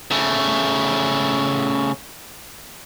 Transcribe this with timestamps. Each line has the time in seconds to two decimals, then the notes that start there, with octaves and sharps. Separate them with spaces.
0.11 C#3 A3